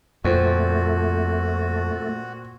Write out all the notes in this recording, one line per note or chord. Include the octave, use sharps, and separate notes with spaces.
F2 A#2 A3 C4 F#4